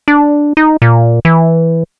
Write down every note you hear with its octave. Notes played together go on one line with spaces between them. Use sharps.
D4
D#4
A#2
E3